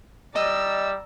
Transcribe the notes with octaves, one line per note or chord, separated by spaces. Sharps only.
G3 D5 D#5 A#5 E6